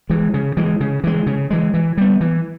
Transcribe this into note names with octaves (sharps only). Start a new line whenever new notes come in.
E3 G#3
C#3
E3 G#3
C#3
E3 G#3
C#3
E3 G#3
E3
G3 B3
E3